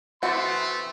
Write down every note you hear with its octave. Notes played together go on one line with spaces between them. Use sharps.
E3 A3 B3 C4 F#4 C6